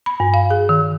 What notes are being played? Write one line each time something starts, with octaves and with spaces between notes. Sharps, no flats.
B5
G2
F5
G#4
D#3